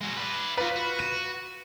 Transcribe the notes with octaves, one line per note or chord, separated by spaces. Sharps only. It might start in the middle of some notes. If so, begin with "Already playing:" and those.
G#3 F#4
B4 D5
F4 F#4 B4 D5
F#4
D#7